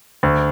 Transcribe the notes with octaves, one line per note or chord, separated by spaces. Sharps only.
D2